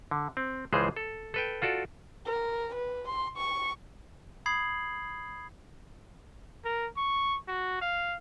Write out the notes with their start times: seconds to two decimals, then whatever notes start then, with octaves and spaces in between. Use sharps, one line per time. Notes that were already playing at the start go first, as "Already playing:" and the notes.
0.11 D3
0.37 C4
0.73 C#2 E3 F3 G#3 G#4 C5
0.96 A4
1.34 A4 B4 G5
1.62 F4 F#4 A4 D5
2.26 A#4
2.75 B4
3.08 C6
3.37 C#6
4.46 B5 D#6 G#6 C7 F#7
6.65 A#4
6.97 C#6
7.48 F#4
7.81 F5